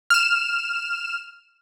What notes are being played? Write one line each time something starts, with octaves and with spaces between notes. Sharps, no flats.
F6 E7